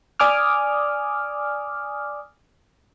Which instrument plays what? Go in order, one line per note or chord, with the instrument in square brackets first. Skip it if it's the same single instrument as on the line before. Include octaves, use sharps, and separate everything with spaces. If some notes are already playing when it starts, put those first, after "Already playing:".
[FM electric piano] D5 G#5 D6 D#6 F6